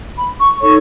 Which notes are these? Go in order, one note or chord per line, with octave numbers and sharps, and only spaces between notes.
B5
C#6
D#4 A4 C#5 C#6